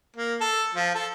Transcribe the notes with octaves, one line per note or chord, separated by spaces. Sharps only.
A#3
A4
F3
A4